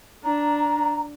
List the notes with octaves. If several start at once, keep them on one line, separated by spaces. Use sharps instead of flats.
D4 A#5